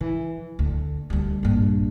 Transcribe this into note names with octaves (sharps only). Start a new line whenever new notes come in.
E3
D2
D2 G3
A#1 G2